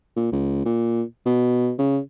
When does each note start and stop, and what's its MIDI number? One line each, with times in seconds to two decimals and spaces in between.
0.16 0.27 46
0.32 0.61 37
0.65 1.02 46
1.26 1.72 47
1.79 1.99 49